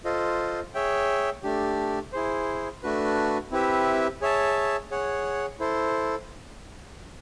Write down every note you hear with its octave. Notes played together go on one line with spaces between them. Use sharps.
F4 A4 C5 D#5
G#4 C#5 E5 G5
A3 D4 G4
E4 G#4 C5
A3 D4 F#4 B4
C4 E4 G4 B4 E5
G#4 C#5 E5 A5
G#4 C#5 F#5
E4 A4 C5